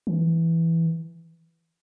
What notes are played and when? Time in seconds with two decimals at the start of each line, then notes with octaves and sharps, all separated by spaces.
0.07 E3